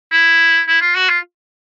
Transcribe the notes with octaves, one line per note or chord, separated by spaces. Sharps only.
E4
E4
F4
F#4
F4